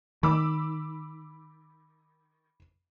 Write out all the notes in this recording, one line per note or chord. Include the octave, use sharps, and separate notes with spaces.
D#3 B5 D6 E6